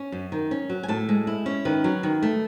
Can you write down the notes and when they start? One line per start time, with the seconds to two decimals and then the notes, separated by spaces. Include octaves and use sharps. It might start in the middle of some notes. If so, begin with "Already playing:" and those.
Already playing: C#4
0.12 F#2
0.32 D#3
0.51 C#4
0.70 F#3
0.83 G#5
0.88 A2 A5
1.09 G#3
1.27 E4
1.46 C#4
1.65 D#3 B4
1.84 F#3
2.03 D#3
2.23 A3